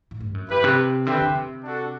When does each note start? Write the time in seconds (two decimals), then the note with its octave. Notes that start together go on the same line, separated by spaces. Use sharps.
0.11 A2
0.21 G2
0.34 F#2
0.49 G2 E4 G4 B4
0.64 C3
1.07 D3 C4 G4 B4 E5 G5
1.21 D3
1.35 C3
1.64 D4 F#4 A4